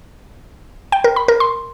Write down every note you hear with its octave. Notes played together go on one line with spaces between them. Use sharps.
G5
A#4
B5
A#4
C6